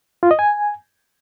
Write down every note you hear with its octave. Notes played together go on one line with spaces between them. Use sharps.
F4
D#5
G#5